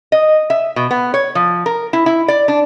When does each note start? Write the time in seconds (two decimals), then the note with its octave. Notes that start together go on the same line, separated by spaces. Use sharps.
0.12 D#5
0.50 E5
0.76 B2
0.91 B3
1.14 C#5
1.35 F3
1.66 A#4
1.93 E4
2.06 E4
2.28 D5
2.48 D4